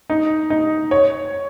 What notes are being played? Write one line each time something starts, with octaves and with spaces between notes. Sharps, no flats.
D#4
D#4
C#5